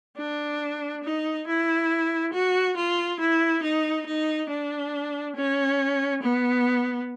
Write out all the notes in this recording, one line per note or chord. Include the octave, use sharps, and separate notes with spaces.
D4
D#4
E4
F#4
F4
E4
D#4
D#4
D4
C#4
B3